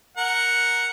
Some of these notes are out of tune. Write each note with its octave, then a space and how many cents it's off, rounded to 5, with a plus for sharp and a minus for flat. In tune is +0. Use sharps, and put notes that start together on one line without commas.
A#4 +0 F#5 +0